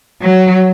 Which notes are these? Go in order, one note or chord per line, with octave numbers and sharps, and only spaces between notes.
F#3